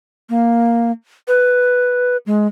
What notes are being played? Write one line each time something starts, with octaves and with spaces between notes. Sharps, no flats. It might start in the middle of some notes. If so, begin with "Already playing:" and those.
A#3
B4
G#3